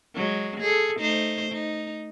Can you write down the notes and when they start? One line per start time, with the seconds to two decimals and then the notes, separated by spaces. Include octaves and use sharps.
0.15 F#3 G#3
0.61 G#4 A4
0.99 A3 D#4 C5
1.52 D#4